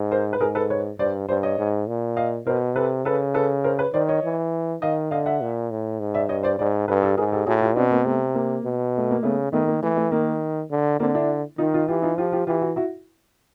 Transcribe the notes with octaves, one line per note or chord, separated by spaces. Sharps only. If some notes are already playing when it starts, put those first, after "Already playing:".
Already playing: G#2
A#4 C5
B4
G#2 G#4 A#4
A4 B4
B4 C#5
G2 C5 D5
G2 C5 D5
C#5 D#5
G#2
A#2
D#5 F5
B2 A#4 C5
C3 A4 B4
C#3 A4 B4
A4 B4
A#4 C5
B4 C#5
D#3 C5 D5
C#5 D#5
E3
D#3 D#5 F5
D3 D#5 F5
E5 F#5
A#2
A2
G#2
D5 E5
G2 C#5 D#5
C5 D5
G#2 C5 D5
G2 A4 B4
G4 A4
G#2 G#4 A#4
G4 A4
A2 F#4 G#4
F4 G4
B2 C4 D4
A#3 C4
C3 A3 B3
A#3
B2
A3
A#3
C#3 A3 B3
D#3 A3 B3
A#3
E3 A3
A3
D#3 A#3
D3
D3 A#3 C4
D4 E4
D#3 D#4 F4
D#4 F4
E3 F4 G4
D#4 F4
F3 F4 G4
F4 G4
E3 F4 G4
E4 F#4
E4 F#4